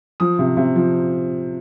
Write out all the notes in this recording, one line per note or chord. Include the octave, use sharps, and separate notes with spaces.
F3 D#6
C3
C3
F3